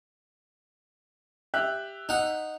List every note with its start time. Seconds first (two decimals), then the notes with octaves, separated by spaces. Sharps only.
1.54 G4 E5 F#6
2.09 D#4 F#5